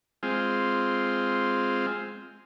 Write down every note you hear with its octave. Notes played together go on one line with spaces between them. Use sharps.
G#3 C4 F4